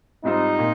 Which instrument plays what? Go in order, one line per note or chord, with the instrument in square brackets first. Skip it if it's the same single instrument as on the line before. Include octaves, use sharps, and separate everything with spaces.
[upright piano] G#2 G3 C4 F4 C5 [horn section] D#4
[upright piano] A#2